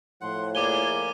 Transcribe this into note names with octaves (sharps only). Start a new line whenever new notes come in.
A2 F3 F#5 C6
A#3 G#4 C#5 D5 G#5 D6 D#7 G7